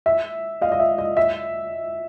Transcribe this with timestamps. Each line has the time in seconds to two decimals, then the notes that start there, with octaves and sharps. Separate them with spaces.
0.06 E5
0.61 D#5 F5
0.72 D#5
0.80 E5
0.98 D#5
1.17 E5